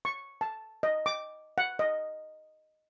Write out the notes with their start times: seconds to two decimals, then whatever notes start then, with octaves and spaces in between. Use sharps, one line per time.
0.05 C#6
0.41 A5
0.83 D#5
1.06 D6
1.58 F#5
1.79 D#5